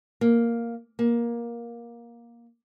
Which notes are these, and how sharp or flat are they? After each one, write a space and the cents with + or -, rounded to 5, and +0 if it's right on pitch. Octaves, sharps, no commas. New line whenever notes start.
A#3 +0
A#3 +15